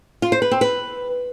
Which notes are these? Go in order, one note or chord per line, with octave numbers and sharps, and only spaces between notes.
F4
C5
B4
C4
B4